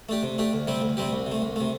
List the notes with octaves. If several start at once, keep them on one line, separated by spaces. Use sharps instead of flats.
A3 D4 G4
C3
A3 D4 G4
D2
C3 G3 C4 G4
D2
C3 G3 C4 G4
C2
C3
A3
C2
C3 A3